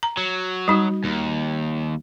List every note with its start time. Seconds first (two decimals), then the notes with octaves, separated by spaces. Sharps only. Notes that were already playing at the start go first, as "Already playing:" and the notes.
0.03 A#5
0.17 F#3
0.68 G3 D#4 F#4
1.04 D#2